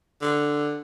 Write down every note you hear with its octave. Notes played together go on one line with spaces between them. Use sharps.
D3